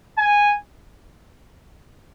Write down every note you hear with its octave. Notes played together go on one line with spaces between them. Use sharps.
G#5